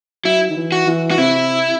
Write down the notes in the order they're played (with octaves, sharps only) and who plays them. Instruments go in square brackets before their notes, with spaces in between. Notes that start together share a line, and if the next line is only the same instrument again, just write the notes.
[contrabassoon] F#3 [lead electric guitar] E4
[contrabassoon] D#3
E3
[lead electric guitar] F#4
[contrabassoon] E3
[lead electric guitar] F#4
[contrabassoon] C3 [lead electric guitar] E4